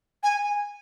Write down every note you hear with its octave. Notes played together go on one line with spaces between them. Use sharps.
G#5